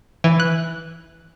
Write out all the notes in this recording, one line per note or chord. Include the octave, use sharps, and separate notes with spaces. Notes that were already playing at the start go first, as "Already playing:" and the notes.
E3
F#6